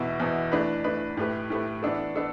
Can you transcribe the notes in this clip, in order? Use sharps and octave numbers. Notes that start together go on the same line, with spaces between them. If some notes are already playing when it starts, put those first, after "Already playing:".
Already playing: E2 B2 B3 E4
E2 B2 B3 E4
E3 A3 D4 B4
E3 A3 D4 B4
A2 A3 G4 B4
A2 A3 G4 B4
E3 B3 D4 A4
B3 D4 A4